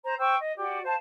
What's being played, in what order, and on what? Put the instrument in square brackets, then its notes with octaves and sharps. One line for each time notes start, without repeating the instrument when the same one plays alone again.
[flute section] C5 A#5
C5 G5 C#6 E6
D#5
F#4 G4 D5
C5 F5 A5